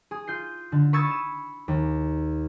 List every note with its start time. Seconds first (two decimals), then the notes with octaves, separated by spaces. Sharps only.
0.11 G#4 D#6
0.27 F4 G6 C7
0.72 D3
0.93 B5 C#6 D#6 E6 G#6 A6
1.11 E7
1.68 D#2